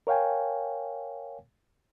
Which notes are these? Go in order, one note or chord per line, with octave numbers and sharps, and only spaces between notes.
A#4 C#5 F5 G5 G#5